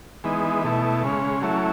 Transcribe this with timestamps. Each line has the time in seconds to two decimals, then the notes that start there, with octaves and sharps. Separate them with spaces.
0.24 E3 G#3 B3 D#4
0.64 B2 A3 E4
1.03 C#3 G#3 C#4
1.42 F#3 A3 C#4 E4